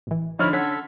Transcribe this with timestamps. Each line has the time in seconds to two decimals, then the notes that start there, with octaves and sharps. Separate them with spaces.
0.07 A1 E3
0.39 D3 F3 D#4 E4 C#5 B5 F6
0.53 C#4 A4 F#5 G#6 B6